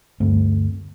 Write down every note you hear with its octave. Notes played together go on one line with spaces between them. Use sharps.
D2 G2 A3 C4